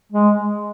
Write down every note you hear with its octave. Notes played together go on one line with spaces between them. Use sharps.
G#3